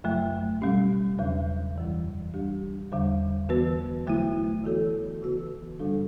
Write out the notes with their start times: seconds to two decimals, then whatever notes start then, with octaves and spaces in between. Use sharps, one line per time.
0.04 F#2 C#3 F#3 A3
0.61 B2 G3 C#4 G4
1.19 E2 C#3 F#3
1.76 F#2 E3 G3
2.34 G3 D4 G4
2.92 E2 D3 G3
3.49 E3 B3 F#4 B4
4.07 D3 F#3 A3 E4
4.64 E3 B3 F#4 A4 C#5
5.22 C#3 E3 B3 F#4 B4
5.79 G2 D3 G3 D4 A4